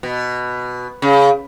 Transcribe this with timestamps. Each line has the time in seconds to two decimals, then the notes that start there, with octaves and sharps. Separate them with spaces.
0.03 B2
1.02 C#3